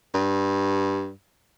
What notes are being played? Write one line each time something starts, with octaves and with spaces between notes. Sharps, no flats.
G2